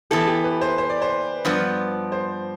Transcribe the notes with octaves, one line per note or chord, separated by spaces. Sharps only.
E3 B3 E4 G4 A4
G4
B4
C5
C5
D5
C5
G2 F3 B3 D5
C5